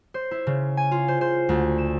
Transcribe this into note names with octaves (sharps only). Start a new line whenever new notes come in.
C5
E4
C#3
G#5
F4
C5
C5
D2
E7